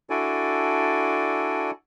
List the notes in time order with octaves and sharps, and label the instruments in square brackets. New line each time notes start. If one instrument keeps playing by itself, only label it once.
[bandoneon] D4 E4 F#4 A4 D5 G#5